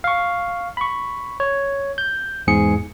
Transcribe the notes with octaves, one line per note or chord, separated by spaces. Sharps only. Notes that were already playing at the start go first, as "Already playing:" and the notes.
F5 C#6
B5 C#6
C#5
G6
E2 G#2 G#4 C#7